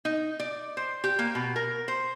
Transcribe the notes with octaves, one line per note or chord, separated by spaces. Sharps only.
D#4
D5
C5
G4
A#3
B2
A#4
C5